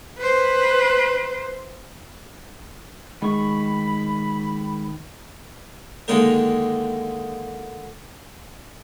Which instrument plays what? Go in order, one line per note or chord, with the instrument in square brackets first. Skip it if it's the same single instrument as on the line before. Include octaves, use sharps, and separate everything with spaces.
[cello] B4 C5
[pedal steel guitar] D#3 C#6 [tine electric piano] G#3 [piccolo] B5
[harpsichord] D3 D#3 G#3 A#3 D#4 A#4